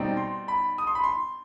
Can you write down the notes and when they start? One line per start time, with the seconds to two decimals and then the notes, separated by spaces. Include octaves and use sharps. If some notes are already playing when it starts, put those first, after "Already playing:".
Already playing: B2 G3 C4 D#4
0.17 C6
0.48 B5
0.78 D#6
0.87 C6
0.95 B5
1.04 C6